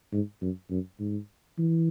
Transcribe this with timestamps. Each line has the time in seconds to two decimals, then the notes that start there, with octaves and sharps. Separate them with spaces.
0.12 G#2
0.41 F#2
0.70 F#2
0.99 G#2
1.58 E3